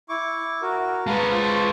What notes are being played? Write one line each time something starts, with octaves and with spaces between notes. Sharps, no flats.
E4 C#6 D6
F#4 A#4
G#3 B4 F5 A5 A#5
F4 C5 A5